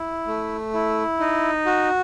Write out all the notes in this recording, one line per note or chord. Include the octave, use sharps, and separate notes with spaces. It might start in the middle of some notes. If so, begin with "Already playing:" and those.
Already playing: E4
A3
E4
D#4
F#4